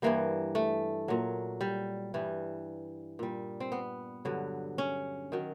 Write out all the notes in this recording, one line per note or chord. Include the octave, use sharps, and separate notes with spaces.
G2 E3 G3 A#3
A3
A#2 F#3
G3
G2 E3 G3
A#2 G3
C4
B3
G2 D3 F#3
C#4
D#3 F#3